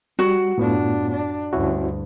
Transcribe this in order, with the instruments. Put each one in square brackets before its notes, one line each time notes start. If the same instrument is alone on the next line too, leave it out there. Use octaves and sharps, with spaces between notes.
[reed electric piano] G3 [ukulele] F#4
[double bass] F#2 D4 [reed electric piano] A2 B3 F4
[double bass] D4
[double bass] D2 G2 [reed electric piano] C#4 E4 F#4